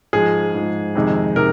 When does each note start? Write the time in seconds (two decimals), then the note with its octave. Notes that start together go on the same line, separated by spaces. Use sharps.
0.13 G#2 F3 G#3 G#4
0.54 G#2 F3 G#3
0.95 F2 C3 D#3 G#3
1.36 C3 D#3 G#3 A#4